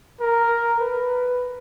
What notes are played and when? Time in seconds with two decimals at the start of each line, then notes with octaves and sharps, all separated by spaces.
0.21 A#4
0.80 B4